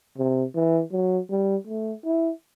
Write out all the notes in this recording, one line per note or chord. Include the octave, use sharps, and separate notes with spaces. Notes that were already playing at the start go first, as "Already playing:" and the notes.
C3
E3
F#3
G3
A3
E4